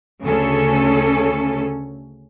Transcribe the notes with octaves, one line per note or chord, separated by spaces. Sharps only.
D2 C#3 C#4 A4